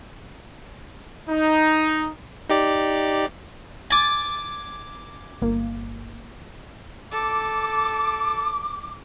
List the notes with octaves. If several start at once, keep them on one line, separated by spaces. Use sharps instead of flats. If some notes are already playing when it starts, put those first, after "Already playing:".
D#4
D#4 G4 D5
G#5 D6 A6
G1 A#3
A4 D6